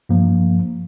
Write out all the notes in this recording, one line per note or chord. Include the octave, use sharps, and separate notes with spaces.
G2 F3 A#3